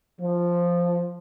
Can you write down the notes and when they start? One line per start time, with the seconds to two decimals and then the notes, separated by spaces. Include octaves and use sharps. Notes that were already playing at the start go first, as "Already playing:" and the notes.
0.20 F3